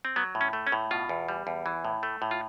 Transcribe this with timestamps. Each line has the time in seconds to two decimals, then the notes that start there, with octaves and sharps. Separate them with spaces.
0.05 C4
0.16 F#3 B3
0.35 A2
0.41 C#4
0.53 A3
0.67 C#4
0.72 A2
0.91 B2 F4
1.09 E2
1.29 G3
1.47 E2
1.66 E3
1.85 A2
2.03 A3
2.22 A2
2.31 F4